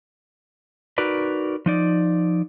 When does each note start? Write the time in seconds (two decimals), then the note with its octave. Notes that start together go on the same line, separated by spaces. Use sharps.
0.98 D#4 F#4 A#4 B4 D5
1.66 F3 D#4 D5